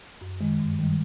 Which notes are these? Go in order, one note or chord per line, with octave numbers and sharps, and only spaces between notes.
F#2
D#3 G#3
G2
D#3 G3